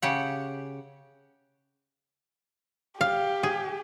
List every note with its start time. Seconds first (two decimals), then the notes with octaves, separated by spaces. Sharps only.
0.02 C#3 G4 F#5
3.01 G4 F5
3.43 G#4